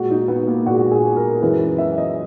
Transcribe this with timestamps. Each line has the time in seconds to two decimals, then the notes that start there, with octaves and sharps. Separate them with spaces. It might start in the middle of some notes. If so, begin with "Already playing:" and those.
Already playing: A#2 G#3 F#4
0.10 D#4
0.28 B3
0.48 A#3
0.66 A#2 G#3 F#4
0.91 G#4
1.16 A#4
1.40 F#2 E3 G#3 B4
1.78 E5
1.98 D#5